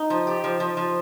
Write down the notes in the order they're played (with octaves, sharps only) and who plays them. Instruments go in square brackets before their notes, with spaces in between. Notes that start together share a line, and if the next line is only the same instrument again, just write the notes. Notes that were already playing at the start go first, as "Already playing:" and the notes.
Already playing: [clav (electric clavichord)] D#4
[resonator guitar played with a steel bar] F3
G4
F3
F3
F3